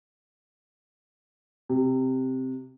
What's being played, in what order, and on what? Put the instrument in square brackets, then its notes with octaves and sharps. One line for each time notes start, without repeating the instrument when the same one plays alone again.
[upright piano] C3